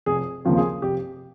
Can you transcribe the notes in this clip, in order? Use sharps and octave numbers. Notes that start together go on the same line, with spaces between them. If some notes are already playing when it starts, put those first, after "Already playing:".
F1 G#4
D#2 C#3 F3 C4
G#4
F1 G4